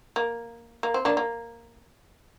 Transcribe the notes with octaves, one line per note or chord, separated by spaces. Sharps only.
A#3
A#3
C4
A#3 D4
A#3